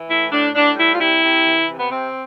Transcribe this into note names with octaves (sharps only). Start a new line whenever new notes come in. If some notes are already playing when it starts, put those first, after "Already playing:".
Already playing: E3
A2 E4
A2 D4
A2 D4
G3 E4
F4
C3 E4
C3
E3
C3
B3
C3 C4